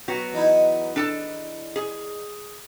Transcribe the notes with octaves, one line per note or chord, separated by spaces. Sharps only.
F#3 B3 F#4
E2 D#4 E4
D4 A4 A5
G#4